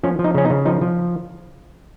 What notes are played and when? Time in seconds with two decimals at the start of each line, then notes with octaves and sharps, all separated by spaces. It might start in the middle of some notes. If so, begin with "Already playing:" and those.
0.03 F3 C#4
0.19 F3
0.24 D#4
0.34 C#3 C#4
0.45 D#4
0.50 C#3
0.65 F3 D#4
0.81 F3